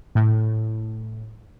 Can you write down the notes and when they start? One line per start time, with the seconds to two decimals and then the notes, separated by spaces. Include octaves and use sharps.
0.15 A2